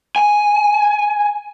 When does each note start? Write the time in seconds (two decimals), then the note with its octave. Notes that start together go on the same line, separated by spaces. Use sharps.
0.16 G#5